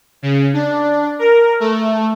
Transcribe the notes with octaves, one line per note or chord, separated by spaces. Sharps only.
C#3
D4
A#4
A3